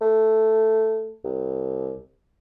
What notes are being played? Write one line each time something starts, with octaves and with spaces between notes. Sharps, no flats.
A3
C2